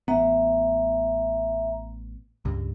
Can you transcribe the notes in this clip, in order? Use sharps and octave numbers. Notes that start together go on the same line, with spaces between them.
A1 B3 E5 A#5
C#2 G2